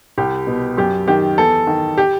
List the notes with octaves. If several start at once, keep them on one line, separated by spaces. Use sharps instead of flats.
C2 G4
B2
F#2 G4
D#3 G4
E2 A4
D#3
G4